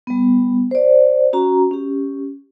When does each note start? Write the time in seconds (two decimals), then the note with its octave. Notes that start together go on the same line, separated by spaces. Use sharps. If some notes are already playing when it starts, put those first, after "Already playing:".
0.07 G3 B3
0.71 C5 D5
1.33 C#4 F#4 A#5
1.71 C#4 G4